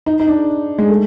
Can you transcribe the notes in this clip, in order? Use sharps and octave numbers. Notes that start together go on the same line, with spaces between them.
D#4
D#4
D4
G#3
A3